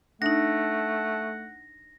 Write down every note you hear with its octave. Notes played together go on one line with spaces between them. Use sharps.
A3 D4 D#4 F#5 A#6